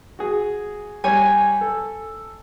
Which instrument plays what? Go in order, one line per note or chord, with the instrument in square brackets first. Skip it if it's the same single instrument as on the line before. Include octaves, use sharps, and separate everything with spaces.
[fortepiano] F#4 G#4
[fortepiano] G3 C#5 [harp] G#5
[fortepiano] A4